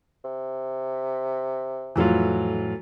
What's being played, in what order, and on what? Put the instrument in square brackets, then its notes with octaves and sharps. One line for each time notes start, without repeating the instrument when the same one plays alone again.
[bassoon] C3
[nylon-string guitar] F2 A2 E4 [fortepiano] E3 F#3 F4